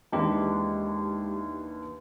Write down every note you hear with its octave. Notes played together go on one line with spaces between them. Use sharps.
D#2 E3 G#3 D4 G4